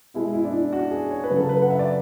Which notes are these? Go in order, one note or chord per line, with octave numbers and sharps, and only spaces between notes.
B2 G#3 E4
E4
D4
E4
F#4
G#4
C#5
B4
C#3 F#3
A4
B4
F#5
E5
D5